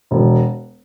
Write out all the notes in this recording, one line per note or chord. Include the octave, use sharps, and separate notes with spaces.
E1